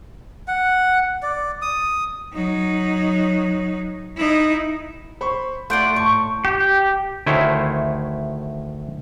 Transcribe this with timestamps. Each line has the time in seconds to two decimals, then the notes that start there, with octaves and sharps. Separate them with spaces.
0.48 F#5
1.23 D5
1.62 D#6
2.33 F#3 D#4
4.17 D#4 E4
5.21 C5 B5 C#6
5.70 A3 F4 D5 F#5 C6 G6 D7
5.96 A2 A5 C#6
6.45 G4
7.26 D2 D#3 A3 E4 C5 C#5